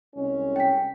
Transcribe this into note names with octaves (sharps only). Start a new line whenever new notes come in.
C2 G#3 C#4
G5 B6